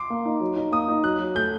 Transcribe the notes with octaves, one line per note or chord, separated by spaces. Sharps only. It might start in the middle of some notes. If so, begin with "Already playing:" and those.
Already playing: C6 D6
A#3
D#4
F#3
D#4
A#3 D#6
D#4
F#3 F#6
F#3
A3 G6